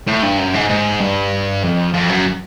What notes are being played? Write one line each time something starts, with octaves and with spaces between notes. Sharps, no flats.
A2
G2
F#2
G#2
G#2
G2
F2
F2
F#2